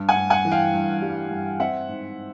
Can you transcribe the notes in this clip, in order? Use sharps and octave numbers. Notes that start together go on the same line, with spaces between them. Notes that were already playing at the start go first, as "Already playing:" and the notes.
Already playing: G2
F#5 G#5
G2
F#5 G#5
E3
F5 G5
G2
G3
G2
C4 E5 F#5
G#2